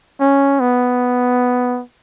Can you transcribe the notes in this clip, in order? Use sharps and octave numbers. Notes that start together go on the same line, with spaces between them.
C#4
B3